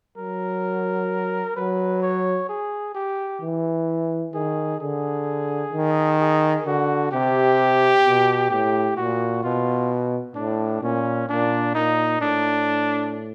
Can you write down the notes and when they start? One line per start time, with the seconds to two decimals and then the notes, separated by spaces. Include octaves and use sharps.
0.17 F#3 A#4
1.56 F#3 B4
2.03 C#5
2.49 G#4
2.95 G4
3.41 E3
4.34 D#3 G#4
4.81 D3 G#4
5.73 D#3
6.19 G#4
6.66 D3 F#4
7.12 C3 G4
8.05 B2
8.50 A2 G4
8.97 A#2 F#4
9.43 B2 F4
10.36 A2 D4
10.82 A#2 C#4
11.29 A#2 D4
11.75 A#2 D#4
12.21 A2 D4